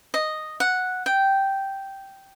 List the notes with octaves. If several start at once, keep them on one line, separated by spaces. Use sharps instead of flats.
D#5
F#5
G5